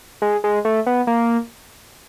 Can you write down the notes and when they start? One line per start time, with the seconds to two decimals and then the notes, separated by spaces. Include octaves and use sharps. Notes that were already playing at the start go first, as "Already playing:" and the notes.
0.22 G#3
0.44 G#3
0.65 A3
0.86 B3
1.07 A#3